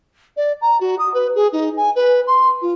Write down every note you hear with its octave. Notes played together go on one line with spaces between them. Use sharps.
D5
A#5
F#4
D#6
B4
G#4
D#4
G#5
B4
C6
F4